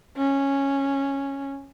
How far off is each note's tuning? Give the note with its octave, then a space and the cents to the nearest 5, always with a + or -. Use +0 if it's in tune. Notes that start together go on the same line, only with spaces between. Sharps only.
C#4 -5